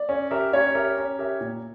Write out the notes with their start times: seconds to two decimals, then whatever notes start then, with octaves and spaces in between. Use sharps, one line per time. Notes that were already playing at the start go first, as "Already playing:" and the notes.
Already playing: D5
0.09 C#4
0.31 G4 A#4 E5
0.53 C#4 C#5
0.74 G4 A#4 E5
0.97 C#4
1.19 G4 A#4 E5
1.40 A#2